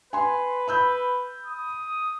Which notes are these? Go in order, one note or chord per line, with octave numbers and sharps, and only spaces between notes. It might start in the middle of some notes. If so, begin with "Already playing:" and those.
B4 G#5 C6
B5 E6 G6
D#6